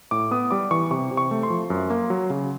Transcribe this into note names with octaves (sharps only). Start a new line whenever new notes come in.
A2 D6
B3 D#6
G3 D6
E3 C#6
C3 C#6
C3
C#6
A3
C6
F3
F#2
A#3
F#3
C#3